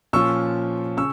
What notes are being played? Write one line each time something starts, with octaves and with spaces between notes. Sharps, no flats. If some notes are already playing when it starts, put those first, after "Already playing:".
A#2 F3 C#4 F4 C#6 E6
C#3 C#6 E6